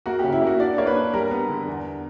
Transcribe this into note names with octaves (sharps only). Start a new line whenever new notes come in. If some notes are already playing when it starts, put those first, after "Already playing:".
A#3 F#4
G4
C#3
E4
A#3 F#4
D4 D5
A#3 C#5
B4
D4
G3 A#4
B3
D3
E2